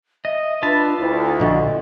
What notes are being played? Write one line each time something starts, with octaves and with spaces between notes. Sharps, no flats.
D#5 E5
D4 F4 B4 E5 A5
D2 E4
A#1 D3 F#4 D#5